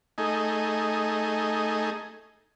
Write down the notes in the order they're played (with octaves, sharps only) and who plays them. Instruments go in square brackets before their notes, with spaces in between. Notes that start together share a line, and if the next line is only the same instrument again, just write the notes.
[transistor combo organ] A3 D#4 G#4